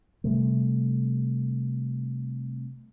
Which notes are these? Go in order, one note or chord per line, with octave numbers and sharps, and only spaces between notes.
C3 G3 A3